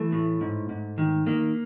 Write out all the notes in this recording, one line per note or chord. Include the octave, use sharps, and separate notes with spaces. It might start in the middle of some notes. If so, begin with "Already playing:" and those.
Already playing: E3 A3
A2
G#2
G#2
D#3
D#3 A#3